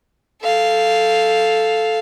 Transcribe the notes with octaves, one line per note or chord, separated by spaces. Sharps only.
A4 F5